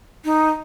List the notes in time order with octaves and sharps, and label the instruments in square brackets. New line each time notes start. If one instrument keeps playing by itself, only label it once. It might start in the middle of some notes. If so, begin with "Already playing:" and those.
[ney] D#4